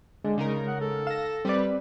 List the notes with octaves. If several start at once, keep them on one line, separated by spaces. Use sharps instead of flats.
D3 G#3
C#3 D#4 A#4
F#5
A4
F5 A#6 E7
G3 C4 B4 D5